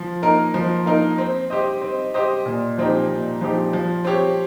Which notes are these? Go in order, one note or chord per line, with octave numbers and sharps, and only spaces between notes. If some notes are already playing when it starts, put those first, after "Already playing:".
Already playing: F3
A#3 D#4 A#4
F3
A#3 D#4 A#4
C4
G4 C5 D#5
C4
G4 C5 D#5
A#2
F3 C4 D#4 G4
A#2
F3 C4 D#4 G4
F3
C4 G4 C#5